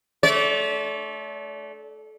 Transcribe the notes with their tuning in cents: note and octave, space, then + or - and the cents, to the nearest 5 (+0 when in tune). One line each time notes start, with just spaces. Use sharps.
A3 -25 D5 -40